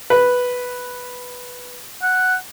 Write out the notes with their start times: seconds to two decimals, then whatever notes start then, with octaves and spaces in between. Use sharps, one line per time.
0.10 B4
2.03 F#5